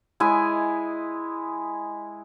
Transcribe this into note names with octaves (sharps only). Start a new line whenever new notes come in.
G#3 E4 D#5 G#5